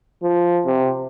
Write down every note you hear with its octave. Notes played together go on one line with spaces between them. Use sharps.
F3
C3